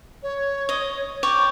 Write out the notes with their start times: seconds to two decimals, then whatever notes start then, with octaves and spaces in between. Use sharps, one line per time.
0.23 C#5
0.69 D#5
1.23 C#5 D5 G5 D6